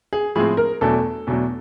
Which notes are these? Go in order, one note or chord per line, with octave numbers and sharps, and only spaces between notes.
G#4
A2 F3 G#3 C4 G#4
A#4
E2 B2 F#3 A3 D4 A4
E2 B2 F#3 A3 D4